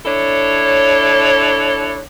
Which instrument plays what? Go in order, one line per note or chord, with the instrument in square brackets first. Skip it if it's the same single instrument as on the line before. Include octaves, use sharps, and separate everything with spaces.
[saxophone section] D4 E4 A4 C#5